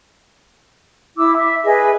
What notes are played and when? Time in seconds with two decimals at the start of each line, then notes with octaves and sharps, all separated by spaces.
1.17 E4 D6 E6
1.37 E5
1.65 G#4 B4 D#5 E5